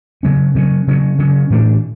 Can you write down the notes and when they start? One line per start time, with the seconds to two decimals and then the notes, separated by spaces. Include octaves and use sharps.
0.23 C#3 F#3 C#4
0.55 C#3 F#3 C#4
0.87 C#3 F#3 C#4
1.18 C#3 F#3 C#4
1.50 A2 E3 A3 D4